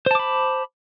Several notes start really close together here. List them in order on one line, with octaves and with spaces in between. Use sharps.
C5 A5 D6 B5